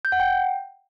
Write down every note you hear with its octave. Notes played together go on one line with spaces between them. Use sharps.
G6
F#5
G5